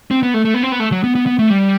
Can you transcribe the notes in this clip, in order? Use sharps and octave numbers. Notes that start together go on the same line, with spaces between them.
C4
B3
A3
A3
B3
C4
B3
A3
F#3
B3
B3
B3
A3
G3